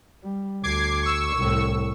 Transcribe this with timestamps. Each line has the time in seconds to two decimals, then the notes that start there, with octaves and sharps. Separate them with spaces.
0.24 G3
0.64 D2 D6 G#6 C7
1.03 C#6 E6
1.37 C2 A2